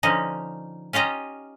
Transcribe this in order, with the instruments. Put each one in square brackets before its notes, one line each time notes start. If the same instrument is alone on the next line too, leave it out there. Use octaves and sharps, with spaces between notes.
[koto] D3 F3 C#4 D#4
C#4 F4 G4 D#5 A#5